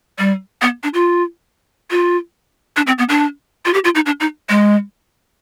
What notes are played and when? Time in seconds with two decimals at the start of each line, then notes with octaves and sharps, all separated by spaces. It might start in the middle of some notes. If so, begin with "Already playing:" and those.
0.19 G3
0.62 B3
0.83 D4
0.94 F4
1.91 F4
2.76 D4
2.87 C4
2.98 B3
3.09 D4
3.65 F4
3.74 G4
3.84 F4
3.95 D#4
4.06 D4
4.20 D#4
4.49 G#3